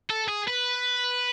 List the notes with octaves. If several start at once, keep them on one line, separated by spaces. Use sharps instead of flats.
A4
G#4
B4